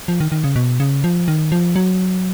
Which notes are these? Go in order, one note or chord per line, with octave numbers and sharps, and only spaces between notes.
F3
D#3
D#3
C#3
B2
C#3
F3
D#3
F3
F#3